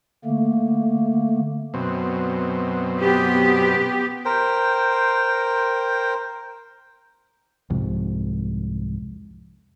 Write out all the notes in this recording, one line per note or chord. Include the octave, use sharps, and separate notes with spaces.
D3 A3 A#3
F#2 B2 C4
B3 G4
A#4 C5 G5
C2 F2 G#2